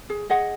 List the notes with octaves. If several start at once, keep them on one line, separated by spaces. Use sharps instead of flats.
G#4
G#4 D#5 F#5